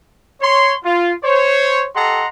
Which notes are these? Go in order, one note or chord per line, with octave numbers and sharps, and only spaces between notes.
C#5 C6
F4
C5 C#5
G4 A4 D#5 F#5 A#5 C6